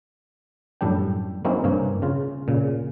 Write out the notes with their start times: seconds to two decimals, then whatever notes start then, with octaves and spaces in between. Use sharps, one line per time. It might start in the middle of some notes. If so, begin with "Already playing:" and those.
0.81 F#2 A2 G3 D4 G5
1.45 F#3 A#3 C4 C#4 D#4 E4
1.64 G2 C3 A#3 C#5
2.02 C#3 F4
2.48 A#2 C#3